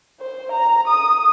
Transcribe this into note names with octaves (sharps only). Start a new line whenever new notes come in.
C5
A#5
D#6